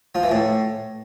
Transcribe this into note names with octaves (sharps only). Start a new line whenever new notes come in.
F3
E3
A2